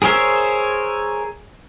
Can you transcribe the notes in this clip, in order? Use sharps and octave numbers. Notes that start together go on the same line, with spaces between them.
G#4 A#4 C5 C#5 E5